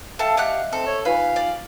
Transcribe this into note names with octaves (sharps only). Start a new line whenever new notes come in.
A4 E5 F5 G5 A5
G4 D#5 E5 F#5 F#6
C4 A4
C#5
D#4 F4 B4 F5 G#5
D5